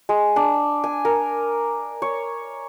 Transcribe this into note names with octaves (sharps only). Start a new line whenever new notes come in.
G#3
D4
G#5
A#4
C#5